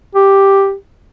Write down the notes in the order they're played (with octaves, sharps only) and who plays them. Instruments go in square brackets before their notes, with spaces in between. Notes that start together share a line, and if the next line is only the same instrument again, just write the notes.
[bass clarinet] G4